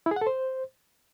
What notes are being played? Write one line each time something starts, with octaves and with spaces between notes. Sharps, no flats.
E4
G#4
F#5
A4
C5